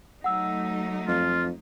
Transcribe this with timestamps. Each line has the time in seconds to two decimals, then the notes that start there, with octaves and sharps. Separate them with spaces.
0.24 F#3 A3 D#4 F#5 E6
1.08 F2 F4